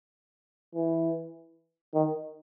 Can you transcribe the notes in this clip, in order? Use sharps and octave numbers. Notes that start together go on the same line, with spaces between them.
E3
D#3